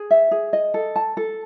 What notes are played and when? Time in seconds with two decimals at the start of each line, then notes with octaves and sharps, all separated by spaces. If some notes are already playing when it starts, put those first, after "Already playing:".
Already playing: G#4
0.11 E5
0.31 G#4
0.53 D#5
0.74 A4
0.96 A5
1.17 A4